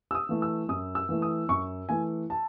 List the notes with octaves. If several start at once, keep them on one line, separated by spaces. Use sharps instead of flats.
E6
D#6
E3 A3
E6
F#2 D#6
E6
E3 A3
D#6
F#2 C#6
E3 A3 G#5
A5